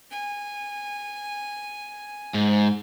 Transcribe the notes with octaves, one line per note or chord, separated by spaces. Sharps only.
G#5
G#2